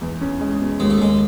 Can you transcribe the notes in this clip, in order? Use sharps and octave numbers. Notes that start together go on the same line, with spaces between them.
E2
C#4
G#3
B2
D#2 G#3
A3
D#2 G#3